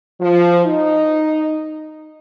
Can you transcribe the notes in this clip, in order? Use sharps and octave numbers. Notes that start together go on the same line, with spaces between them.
F3
D#4